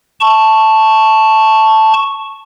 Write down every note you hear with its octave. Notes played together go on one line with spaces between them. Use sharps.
A5 C#6